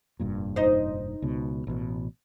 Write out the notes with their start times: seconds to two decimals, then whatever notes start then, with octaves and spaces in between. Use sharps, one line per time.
0.20 F1 G2 A#2
0.56 D#4 C5
1.22 C#2 B2
1.67 A1 B2